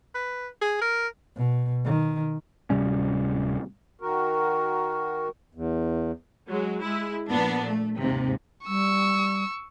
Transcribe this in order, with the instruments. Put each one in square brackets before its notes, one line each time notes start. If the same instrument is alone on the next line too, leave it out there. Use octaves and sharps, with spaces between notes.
[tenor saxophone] B4
G#4
A#4
[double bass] B2
D#3
[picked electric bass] D1 C3 G3 C#4
[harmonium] D#3 F#4 A#4
E2
[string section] F#3 G#3
G#3 E4
A#2 F3 B3 D4
A3
D#2 G#2 C3
[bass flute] G3 [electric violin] C#6 E6